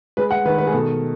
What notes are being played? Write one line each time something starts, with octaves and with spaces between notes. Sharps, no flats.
G#3 B4
F#5
D#3 B4
B4
G#4
B2 A4